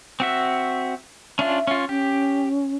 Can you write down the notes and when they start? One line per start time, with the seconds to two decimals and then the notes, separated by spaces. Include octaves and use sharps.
0.20 C4 F#4 E5
1.39 C#4 D4 F4 E5
1.67 C#4 F4
1.89 C#4 G4